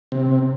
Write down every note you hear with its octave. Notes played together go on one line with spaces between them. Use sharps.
C3